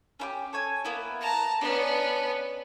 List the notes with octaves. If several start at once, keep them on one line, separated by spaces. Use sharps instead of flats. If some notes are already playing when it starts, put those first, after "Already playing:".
C#4 E4 G4
A4 C#5 G#5
A#3 B3 E4
A5 A#5
B3 C#4 D4 D5